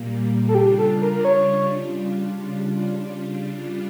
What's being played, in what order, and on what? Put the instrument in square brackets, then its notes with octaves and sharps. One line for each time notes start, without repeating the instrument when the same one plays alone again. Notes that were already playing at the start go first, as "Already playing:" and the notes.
Already playing: [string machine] A#2 G3 A#3
[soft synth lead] A4
[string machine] C#3 G3 D4 F4 [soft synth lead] G4
[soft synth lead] A4
A#4
A#4
C#5